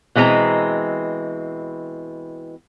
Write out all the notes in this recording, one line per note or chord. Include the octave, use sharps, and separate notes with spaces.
B2 E3 G#3 C4 A#5